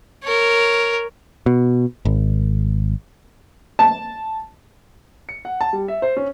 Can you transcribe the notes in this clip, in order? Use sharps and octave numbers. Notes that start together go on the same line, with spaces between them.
A#4 C#5
B2
G#1
A5
C#7
F#5
A5
G3
E5
C5
C#4